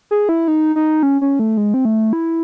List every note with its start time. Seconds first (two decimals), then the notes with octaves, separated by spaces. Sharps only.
0.11 G#4
0.29 E4
0.48 D#4
0.76 D#4
1.03 C#4
1.22 C#4
1.39 A3
1.57 G#3
1.74 C4
1.85 A3
2.13 E4